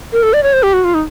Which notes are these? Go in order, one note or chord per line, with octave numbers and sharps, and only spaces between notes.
A#4
A4
D5
C#5
C5
G4
F#4
F4
D#4